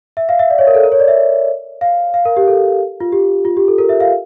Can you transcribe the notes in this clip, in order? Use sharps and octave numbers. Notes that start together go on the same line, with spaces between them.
E5
F5
E5
D5
C#5
A#4
A4
A#4
C#5
D5
E5
F5
F5
A#4
G4
A4
F4
G4
F4
G4
A4
A#4
E5
F5